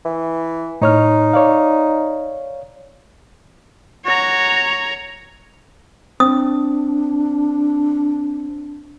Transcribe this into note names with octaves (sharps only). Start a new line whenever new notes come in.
E3
A2 D#4 C#5 F6
C#5 D5 F5
F#4 C#5 A#5
C4 D4 D#6